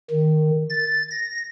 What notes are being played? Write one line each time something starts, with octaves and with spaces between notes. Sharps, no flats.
D#3
A6
A#6